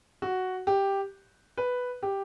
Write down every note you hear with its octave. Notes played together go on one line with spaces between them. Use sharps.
F#4
G4
B4
G4